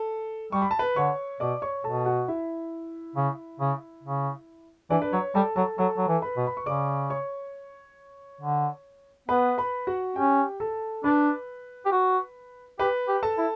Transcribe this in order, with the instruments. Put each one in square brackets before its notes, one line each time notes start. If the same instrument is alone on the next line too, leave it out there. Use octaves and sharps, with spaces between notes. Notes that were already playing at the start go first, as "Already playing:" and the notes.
Already playing: [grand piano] A4
[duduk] G3 [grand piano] C#6
[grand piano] B5
A5
B4 B5
[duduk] D3 [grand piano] C#5 C#6
[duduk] B2 [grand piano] D5 D6
[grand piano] C#5 C#6
[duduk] B2 [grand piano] A4 A5
[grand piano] F#4 F#5
E4 E5
[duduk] C#3
C#3
C#3
[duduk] E3 [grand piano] D4 D5
[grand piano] B4
[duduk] F#3 [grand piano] C#5
[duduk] G3 [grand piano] A4 A5
[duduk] F#3 [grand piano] A4 A5
[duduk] F#3 [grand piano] A4 A5
[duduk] F#3
E3
[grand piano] B4 B5
[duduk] B2
[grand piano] B5
C#6
[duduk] C#3 [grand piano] D5 D6
[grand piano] C#5 C#6
[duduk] D3
[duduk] B3 [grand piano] B4 B5
[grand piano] B4 B5
F#4 F#5
[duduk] C#4 [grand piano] G4 G5
[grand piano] A4 A5
[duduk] D4 [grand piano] B4 B5
[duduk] G4
F#4
[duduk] G4 [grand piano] B4 B5
[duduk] G4
[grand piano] A4 A5
[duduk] E4